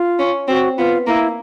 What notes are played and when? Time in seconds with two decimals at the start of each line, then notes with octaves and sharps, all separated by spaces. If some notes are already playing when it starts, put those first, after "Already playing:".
Already playing: F4
0.19 C#4
0.48 C4 F#4
0.77 B3 F4
1.07 A#3 E4